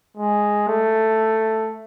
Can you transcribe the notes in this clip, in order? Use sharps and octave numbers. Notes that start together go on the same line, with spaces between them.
G#3
A3